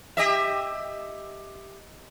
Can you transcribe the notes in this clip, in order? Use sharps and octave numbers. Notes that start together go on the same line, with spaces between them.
G4 D#5 E5